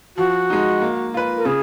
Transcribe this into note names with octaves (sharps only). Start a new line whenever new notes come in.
F3 F#4
G#3 D#4
A#3
F4 B4
A#4
C#3 G#4